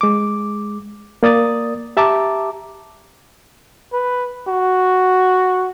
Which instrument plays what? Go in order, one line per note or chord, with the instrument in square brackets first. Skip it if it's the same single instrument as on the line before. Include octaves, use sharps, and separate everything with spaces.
[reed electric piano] G#3 D6
A#3 D5 D#6 A6
G4 E5 A5 A#5 D6
[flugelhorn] B4
F#4